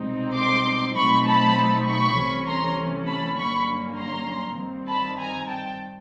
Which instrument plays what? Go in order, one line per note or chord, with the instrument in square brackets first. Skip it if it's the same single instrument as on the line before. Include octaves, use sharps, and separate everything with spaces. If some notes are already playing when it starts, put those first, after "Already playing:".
Already playing: [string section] C2 B2 G#3 C4 D#4
C6 D6
B2 F#3 A3 C4 D#4 B5 C#6
A5 B5
B5 C#6
C2 C3 E3 A3 C#4
A#5 C6
A5 B5
G2 D3 F#3 A#3 C#4 B5 C#6
A#5 C6
G2 D#3 G3 C4
A5 B5
G#5 A#5
G5 A5